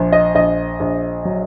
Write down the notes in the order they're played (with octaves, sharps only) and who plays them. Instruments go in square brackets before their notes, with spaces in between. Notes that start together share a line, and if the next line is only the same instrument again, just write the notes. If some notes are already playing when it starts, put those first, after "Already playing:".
Already playing: [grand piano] A#1 F3
D#5
A#1 D#5
A#1
F#3